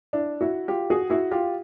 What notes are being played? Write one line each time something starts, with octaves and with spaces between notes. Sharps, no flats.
D4 E4
E4 F#4
F4 G4
F#4 G#4
E4 F#4
F4 G4